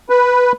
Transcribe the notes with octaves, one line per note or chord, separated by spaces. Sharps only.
B4